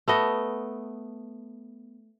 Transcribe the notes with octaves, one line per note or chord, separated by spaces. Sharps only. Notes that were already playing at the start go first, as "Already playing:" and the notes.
A3 B3 D#5